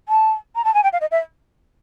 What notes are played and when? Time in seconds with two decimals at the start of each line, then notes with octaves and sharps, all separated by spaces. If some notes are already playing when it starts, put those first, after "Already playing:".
0.09 A5
0.55 A#5
0.65 A5
0.74 G#5
0.83 G5
0.93 F5
1.01 D#5
1.11 E5